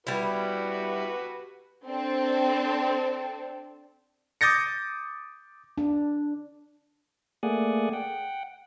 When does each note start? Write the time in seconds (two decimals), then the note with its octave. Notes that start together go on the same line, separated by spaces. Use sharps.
0.07 G3 E4 F#4 G4 B4
1.86 C4 D4 A4
4.41 D6 D#6 G6 A6 A#6 C#7
5.78 D4
7.43 A3 A#3 G#4 D5 F#5 G#5
7.93 F#5 G5